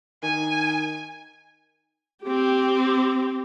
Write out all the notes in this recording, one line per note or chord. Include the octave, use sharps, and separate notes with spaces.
D#3 G#5
C4 G4